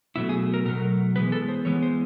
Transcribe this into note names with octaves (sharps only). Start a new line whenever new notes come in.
B2 F#3 A3 E4
G#4
A#4
B2 F#3 A3 A#4
E3 G#3 B3 B4
A4
C5
E3 G#3 B3 C#5
C5